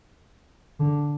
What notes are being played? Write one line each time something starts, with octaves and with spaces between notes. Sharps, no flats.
D3